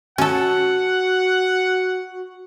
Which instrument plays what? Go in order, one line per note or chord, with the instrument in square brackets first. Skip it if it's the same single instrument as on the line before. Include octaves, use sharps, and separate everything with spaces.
[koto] C#4 A4 [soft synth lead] F#4 [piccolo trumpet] F#5